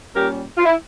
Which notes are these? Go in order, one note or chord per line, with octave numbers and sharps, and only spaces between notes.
A#2 G3 C#4 G4 A#4
F4
E4